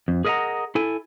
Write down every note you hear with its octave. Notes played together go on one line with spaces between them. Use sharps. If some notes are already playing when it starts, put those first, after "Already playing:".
F2
G#4 A#4 D#5 E5 F#5 A#5
E4 A4 G#5